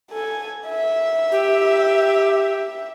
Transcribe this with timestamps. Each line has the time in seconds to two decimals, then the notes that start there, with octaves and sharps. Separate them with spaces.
0.11 A4 G#5
0.67 E5
1.32 G4